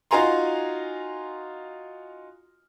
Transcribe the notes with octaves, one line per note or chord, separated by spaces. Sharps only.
D#4 F4 F#4 G#5 A#5 C6